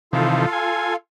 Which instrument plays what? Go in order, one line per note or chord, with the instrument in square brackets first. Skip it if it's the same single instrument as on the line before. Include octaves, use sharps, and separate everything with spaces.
[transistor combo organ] C3 D#3 E3 [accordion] F4 A4 F5
[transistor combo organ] G#5